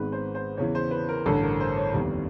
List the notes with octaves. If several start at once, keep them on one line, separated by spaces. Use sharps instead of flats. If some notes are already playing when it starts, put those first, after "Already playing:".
Already playing: G#1 G#2 D#3 G#3 B3 B4
C5
C5
E2 C#3 E3 C#5
C5
B4
A#4
A1 G2 D3 A4
A#4
C5
C#5
F1 D#2 D#3 G3 B3